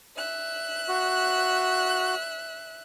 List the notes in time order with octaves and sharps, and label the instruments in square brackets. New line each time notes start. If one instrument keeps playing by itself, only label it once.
[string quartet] E5 F#6
[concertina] F#4